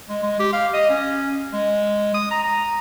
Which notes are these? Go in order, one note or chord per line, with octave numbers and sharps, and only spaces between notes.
G#3
G#3
G4
F5
D#5
C#4
G#3
D#6
A#5
A#5